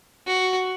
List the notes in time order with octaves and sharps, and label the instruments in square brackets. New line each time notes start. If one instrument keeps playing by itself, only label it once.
[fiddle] F#4